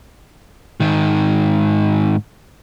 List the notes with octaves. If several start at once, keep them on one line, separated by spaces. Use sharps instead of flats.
G#2 D#3